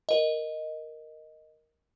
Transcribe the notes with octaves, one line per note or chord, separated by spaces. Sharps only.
A#4 D#5